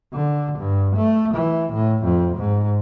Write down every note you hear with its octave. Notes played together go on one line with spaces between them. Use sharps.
D3
G2
A3
E3
A2
F2
G#2